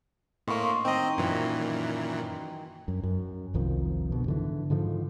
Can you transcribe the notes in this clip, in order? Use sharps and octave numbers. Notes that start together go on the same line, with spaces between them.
A2 A#3 D#5 C6 C#6
D#3 C4 D#5
F#2 A#2 E3
F#2
F#2
F1 C2 D#3 F3
B2 D3
G#2 D3 E3
G#2 D3 D#3 F3